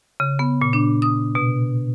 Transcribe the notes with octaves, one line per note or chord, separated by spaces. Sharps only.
C#3
B3
A#2
D4
D#6
B2